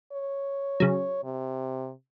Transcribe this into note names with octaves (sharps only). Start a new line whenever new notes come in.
C#5
C#3 F#3
C3